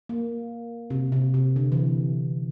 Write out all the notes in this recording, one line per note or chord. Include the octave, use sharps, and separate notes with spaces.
A#3
C3
C3
C3
D3
E3